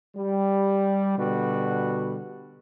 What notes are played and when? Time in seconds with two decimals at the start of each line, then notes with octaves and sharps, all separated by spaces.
0.16 G3
1.18 B2 D3 G3 F#4